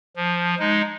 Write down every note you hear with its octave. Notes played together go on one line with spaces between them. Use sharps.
F3
G#3 D#4